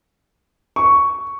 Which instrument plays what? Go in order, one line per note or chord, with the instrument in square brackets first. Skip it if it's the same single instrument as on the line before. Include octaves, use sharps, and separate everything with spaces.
[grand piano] C#6